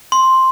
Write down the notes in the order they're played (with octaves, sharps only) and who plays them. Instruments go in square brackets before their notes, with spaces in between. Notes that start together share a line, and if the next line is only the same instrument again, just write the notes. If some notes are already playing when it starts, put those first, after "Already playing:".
[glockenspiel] C6